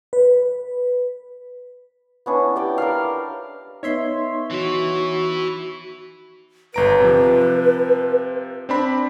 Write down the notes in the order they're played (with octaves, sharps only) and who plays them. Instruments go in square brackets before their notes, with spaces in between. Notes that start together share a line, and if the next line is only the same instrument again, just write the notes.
[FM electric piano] B4
[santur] B3 C#4 D4 E4
G4 D5 G5
A#4 D5 F5
[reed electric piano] B3 D#4 [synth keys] C#5 E5 C6
[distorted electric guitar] E3 E4 [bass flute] F#4
[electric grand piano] G1 A#5 D7 [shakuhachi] B4
[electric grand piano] C3 F3
C4 D4 B5